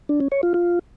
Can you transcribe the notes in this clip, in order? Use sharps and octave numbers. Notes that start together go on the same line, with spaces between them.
D4
C#4
C#5
F4
F4